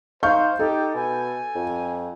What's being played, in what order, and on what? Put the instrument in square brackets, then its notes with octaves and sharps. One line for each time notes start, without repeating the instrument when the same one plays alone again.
[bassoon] D#4 [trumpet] C5 [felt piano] F5 C#6 G6
[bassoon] D#4 [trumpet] G4 [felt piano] A4
[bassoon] B2 [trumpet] G#5
[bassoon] F2